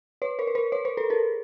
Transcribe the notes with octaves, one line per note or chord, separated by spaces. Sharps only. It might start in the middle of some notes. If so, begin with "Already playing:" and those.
B4 C#5
A#4 C5
B4
A#4 C5
B4 C#5
A#4 C5
A4 B4
G#4 A#4